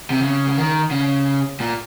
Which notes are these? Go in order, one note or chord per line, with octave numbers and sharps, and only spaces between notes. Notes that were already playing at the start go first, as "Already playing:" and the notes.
C3
C#3
C#3
D#3
C#3
A#2